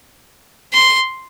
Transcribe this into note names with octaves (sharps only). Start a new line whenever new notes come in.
C6